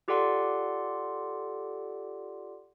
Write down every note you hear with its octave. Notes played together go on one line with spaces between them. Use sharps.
F4 G4 A4 D5 F#5 C6